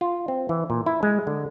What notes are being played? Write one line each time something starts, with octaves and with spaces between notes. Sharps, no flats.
F4
C4
E3
A#2
E4
G#3
D3